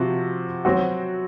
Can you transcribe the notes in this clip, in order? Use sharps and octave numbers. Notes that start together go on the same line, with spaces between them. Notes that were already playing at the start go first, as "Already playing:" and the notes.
Already playing: C3 F3 C4 F#4
F#3 C4 F#4